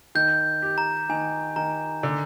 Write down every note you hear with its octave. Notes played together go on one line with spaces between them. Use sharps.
D#3 G6
G4
A#5
D#3 G#5
D#3 A#5
D3